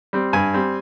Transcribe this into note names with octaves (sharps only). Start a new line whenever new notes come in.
G3 C4
G2 G#5
G3 C4